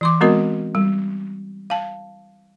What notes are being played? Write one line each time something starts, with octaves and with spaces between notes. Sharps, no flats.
E3 C6 D6
G#3 B3 C4 F#4 A#4 D#5
G3
F5 A5